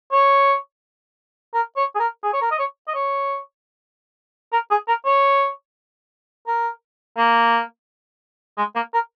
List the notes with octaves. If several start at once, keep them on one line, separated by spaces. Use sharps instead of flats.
C#5
A#4
C#5
G#4
A#4
G#4
C#5
A#4
D#5
C#5
D#5
C#5
A#4
G#4
A#4
C#5
A#4
A#3
G#3
A#3
A#4